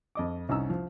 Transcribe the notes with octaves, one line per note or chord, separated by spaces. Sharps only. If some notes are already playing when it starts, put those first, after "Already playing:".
F2 D#5 D6
C2 C#4 D#4 D#5 A#5 E6
F3